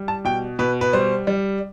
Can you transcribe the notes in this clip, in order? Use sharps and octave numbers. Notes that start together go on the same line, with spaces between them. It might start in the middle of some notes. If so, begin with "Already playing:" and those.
Already playing: G3
A5
B2 G5
B2 B4
B4
G3 C5
G3